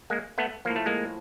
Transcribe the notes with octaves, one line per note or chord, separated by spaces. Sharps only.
G#3 A#3
A3 B3
A2 F3 A#3
A3
G#3 A#3